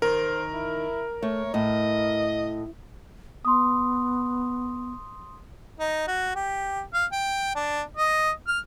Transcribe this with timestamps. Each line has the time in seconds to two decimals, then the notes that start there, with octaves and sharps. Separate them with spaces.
0.02 D#3 A#4 C5
0.54 E4
1.22 A3 C#5
1.54 A2 D#5
3.45 B3 C6 D#6
5.80 D#4
6.08 F#4
6.36 G4
6.94 F5
7.12 G5
7.55 D4
7.97 D#5
8.48 F6